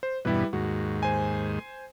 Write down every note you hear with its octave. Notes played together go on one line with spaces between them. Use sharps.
C5
E2 G2 B2 G3 E4 B4
D#2 G#2 F#4
C5 G#5